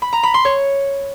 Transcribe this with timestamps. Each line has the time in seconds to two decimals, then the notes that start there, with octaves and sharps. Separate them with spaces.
0.02 B5
0.13 A#5
0.23 B5
0.34 C6
0.45 C#5